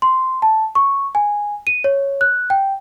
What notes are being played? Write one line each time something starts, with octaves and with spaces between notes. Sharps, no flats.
C6
A5
C#6
G#5
D#7
C#5
F#6
G5